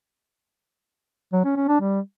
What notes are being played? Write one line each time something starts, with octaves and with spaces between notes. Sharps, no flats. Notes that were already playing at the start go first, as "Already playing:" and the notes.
F#3
C#4
C#4
D4
G3